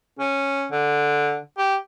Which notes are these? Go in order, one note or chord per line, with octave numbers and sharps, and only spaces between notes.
C#4
D3
G4